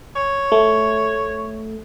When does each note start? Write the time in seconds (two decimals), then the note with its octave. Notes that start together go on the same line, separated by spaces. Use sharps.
0.16 C#5
0.52 A3